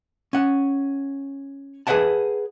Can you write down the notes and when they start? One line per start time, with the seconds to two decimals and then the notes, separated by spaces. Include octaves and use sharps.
0.33 C#4 F#5
1.87 G#4 B4 C5 E5 F#5 A5